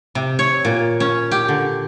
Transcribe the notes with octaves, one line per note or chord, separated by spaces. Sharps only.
C3
C#5
A#2
C#4
G4
D3